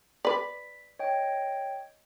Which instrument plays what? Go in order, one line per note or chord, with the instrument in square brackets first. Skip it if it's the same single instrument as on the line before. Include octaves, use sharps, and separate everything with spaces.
[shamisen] B4 D5 [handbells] B6
[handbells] C#5 D#5 G5